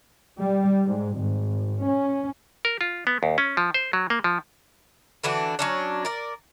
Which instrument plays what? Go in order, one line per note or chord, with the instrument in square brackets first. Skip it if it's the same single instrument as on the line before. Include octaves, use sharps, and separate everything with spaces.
[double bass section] G3
G#2
G#1
C#4
[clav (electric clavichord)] A#4
F4
B3
D#2
C#4
F3
C5
F#3
A#3
F3
[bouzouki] D3 E3 D4 F#4
F#3 C#4 D4
A#4 D5